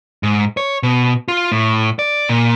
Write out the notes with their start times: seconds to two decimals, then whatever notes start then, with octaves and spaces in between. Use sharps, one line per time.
0.23 G#2
0.57 C#5
0.83 B2
1.28 F4
1.52 A2
1.99 D5
2.29 A#2